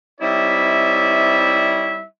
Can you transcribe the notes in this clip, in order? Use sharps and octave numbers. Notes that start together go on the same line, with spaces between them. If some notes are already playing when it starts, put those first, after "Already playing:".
G3 C4 D#4 E4 C#5 E5